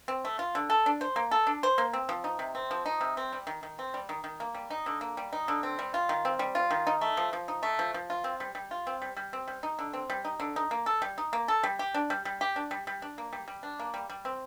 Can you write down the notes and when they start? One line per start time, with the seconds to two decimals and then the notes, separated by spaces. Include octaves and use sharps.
0.08 C4
0.25 A3
0.39 F4
0.55 D3
0.70 A4
0.86 D4
1.01 C5
1.16 A#3
1.31 A4
1.47 D4
1.63 C5
1.78 A#3
1.93 C4
2.09 F3
2.24 D#4
2.39 C3
2.55 C4
2.71 F3
2.86 D#4
3.01 C3
3.17 C4
3.32 G3
3.47 D#3
3.63 D#3
3.79 C4
3.94 G3
4.09 D#3
4.24 D#3
4.40 A#3
4.55 G3
4.71 D#4
4.86 D3
5.01 A#3
5.17 G3
5.33 D#4
5.48 D3
5.63 C4
5.79 G3
5.94 F4
6.09 D#3
6.25 C4
6.39 G3
6.55 F4
6.71 D#3
6.87 D#4
7.01 A3
7.17 F3
7.33 F3
7.48 D#4
7.63 A3
7.79 F3
7.94 F3
8.10 F4
8.24 C4
8.40 G3
8.55 G3
8.71 F4
8.87 C4
9.02 G3
9.17 G3
9.33 C4
9.48 G3
9.63 D#4
9.79 D3
9.93 C4
10.10 G3
10.25 D#4
10.40 D3
10.56 D#4
10.71 A#3
10.86 A4
11.02 G3
11.18 D#4
11.33 A#3
11.48 A4
11.63 G3
11.79 G4
11.94 D4
12.10 G3
12.25 G3
12.41 G4
12.56 D4
12.71 G3
12.87 G3
13.02 D4
13.18 A#3
13.33 G3
13.48 G3
13.63 D4
13.80 A#3
13.94 G3
14.10 G3
14.25 C4